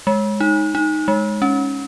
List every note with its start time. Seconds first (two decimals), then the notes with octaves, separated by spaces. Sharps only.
0.07 G#3
0.40 D#4
0.75 D#4
1.08 G#3
1.42 C#4